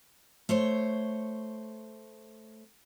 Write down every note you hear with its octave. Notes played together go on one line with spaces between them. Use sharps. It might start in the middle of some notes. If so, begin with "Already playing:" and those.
A3 C5 C#5